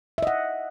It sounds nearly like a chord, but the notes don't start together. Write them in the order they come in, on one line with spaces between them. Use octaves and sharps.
E5 D#5 F#5